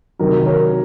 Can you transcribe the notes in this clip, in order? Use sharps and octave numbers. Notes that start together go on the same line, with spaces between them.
C3 D#3 F#3 A#4
A#4 C#5